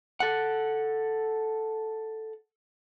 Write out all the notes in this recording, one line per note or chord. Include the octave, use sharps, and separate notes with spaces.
A4 F#5